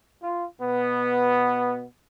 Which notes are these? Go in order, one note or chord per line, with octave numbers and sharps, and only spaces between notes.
F4
B2 B3